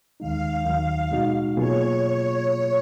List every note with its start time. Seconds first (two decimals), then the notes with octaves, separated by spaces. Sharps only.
0.20 D#2 D#3 G#3 D#4 F5
0.65 D#2 D#3 F#3
1.12 B2 G#3 D#4 F#4
1.57 B2 F#3 A#3 F4 G#4 C#5